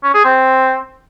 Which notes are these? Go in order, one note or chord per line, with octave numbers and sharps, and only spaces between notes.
C#4
G#4
C4